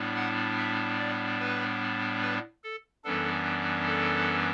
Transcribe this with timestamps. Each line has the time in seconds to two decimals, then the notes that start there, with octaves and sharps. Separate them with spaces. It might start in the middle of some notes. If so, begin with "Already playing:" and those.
Already playing: A2 G3 B3 D4
0.16 F#5
0.58 E5
0.99 D5
1.39 B4
2.22 B4
2.64 A4
3.04 F#2 E3 G3 B3 D4 A4
3.87 A4